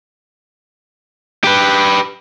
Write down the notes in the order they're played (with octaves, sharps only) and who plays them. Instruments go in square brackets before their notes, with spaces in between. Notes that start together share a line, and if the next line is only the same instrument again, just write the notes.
[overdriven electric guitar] G4 B4